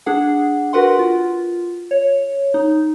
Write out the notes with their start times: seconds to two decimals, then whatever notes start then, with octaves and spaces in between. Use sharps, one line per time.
0.06 D4 G#4 F#5
0.73 F#4 A#4 B4 F#5 C6
0.99 F4
1.91 C#5
2.54 D#4